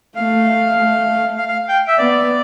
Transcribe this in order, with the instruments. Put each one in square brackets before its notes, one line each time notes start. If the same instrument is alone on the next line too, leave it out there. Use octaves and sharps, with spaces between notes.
[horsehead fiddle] A3 [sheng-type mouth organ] F5
[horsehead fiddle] A3
[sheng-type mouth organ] F5
F5
G5
E5
[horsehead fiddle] B3 [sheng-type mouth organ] D5